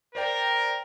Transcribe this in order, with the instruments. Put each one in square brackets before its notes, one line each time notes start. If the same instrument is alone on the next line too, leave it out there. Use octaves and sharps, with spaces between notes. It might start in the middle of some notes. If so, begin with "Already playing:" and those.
[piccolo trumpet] A#4 [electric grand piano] C5 D5 G5